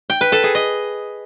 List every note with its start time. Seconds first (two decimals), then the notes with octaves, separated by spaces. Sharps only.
0.10 G5
0.21 B4
0.32 A4
0.43 G#4
0.55 D#5